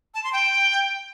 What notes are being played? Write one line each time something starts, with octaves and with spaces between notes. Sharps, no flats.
A5
C6
G5